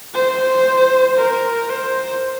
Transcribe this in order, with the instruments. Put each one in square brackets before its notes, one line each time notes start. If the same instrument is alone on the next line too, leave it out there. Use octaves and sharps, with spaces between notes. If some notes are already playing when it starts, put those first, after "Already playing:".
[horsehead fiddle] C5
A#4
C5